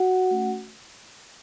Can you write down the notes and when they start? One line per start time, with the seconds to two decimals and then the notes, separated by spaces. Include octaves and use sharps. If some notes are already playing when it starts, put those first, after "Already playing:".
Already playing: F#4 F#5
0.31 A3 C#4 F#4